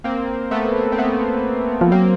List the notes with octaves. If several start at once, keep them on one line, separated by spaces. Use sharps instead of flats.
A#3 C4
A3 B3
C4
A3 B3
F3
F#3 A#3 C4